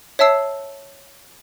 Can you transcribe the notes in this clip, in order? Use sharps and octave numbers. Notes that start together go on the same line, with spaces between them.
C#5 E5 A5 E6 C7